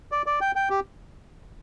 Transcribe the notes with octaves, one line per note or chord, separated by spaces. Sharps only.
D5
D5
G5
G5
G4